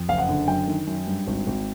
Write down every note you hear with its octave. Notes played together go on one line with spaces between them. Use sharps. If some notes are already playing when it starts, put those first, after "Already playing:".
Already playing: F2
F#1 F5
F#5
D3
F#2 G5
D#3
F#2
G2
G#1
G#1